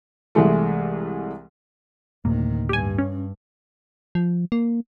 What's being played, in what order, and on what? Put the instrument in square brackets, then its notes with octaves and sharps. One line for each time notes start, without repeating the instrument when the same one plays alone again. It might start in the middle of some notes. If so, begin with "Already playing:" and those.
[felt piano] C2 E3 G#3 A3
[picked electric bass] D2 A2 A#3 [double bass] C3 D#3
[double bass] G2 [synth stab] G4 G#5
[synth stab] C#4
[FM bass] F3
A#3